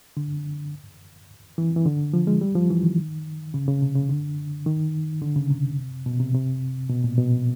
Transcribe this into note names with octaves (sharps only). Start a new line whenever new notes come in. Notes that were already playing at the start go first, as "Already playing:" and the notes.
D3
E3
E3
D3
F3
G#3
G3
F3
E3
D#3
C#3
C#3
C3
C#3
D3
D#3
D3
C#3
C3
B2
C3
C3
B2
A#2
B2